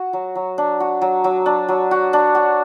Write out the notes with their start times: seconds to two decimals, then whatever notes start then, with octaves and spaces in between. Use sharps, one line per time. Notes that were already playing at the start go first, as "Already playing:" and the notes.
Already playing: F#4
0.13 F#3
0.35 F#3
0.58 D4
0.80 F#4
1.01 F#3
1.24 F#3
1.46 D4
1.68 F#3
1.91 F#4
2.13 D4
2.35 F#4